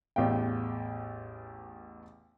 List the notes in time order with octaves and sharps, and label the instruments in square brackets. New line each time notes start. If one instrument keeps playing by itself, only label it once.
[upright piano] A1 E2 F5 G5